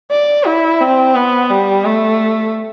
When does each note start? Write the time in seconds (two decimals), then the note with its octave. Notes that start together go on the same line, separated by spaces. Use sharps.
0.11 D5
0.46 E4
0.81 C4
1.15 B3
1.50 G3
1.85 A3